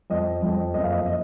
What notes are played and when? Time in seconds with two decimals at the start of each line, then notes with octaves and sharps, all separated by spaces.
0.10 F2 D#5
0.43 F2
0.74 F#1 D#5
0.84 F5
0.92 D#5
1.07 D#5